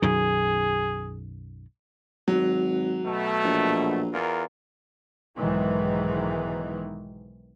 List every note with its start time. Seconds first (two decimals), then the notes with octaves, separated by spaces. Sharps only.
0.02 B1 F#2 D#3 G#4
2.28 G#1 F#3
3.05 B2 A3
3.44 A#1
4.12 E2 F4 A#4
5.36 B1 G#2 D#3 E3 G#3